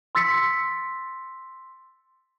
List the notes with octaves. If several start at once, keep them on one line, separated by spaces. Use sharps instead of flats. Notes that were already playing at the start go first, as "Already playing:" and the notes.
C6 E6 A6 B6 C#7